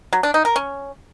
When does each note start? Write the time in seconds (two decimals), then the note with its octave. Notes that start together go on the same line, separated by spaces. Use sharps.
0.13 F#3
0.23 D4
0.34 D#4
0.45 A#4
0.56 C#4